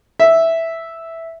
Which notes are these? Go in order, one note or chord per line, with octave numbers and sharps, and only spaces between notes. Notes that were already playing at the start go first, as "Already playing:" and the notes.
E5